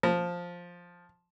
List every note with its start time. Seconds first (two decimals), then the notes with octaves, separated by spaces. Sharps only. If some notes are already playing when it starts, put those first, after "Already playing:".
0.03 F3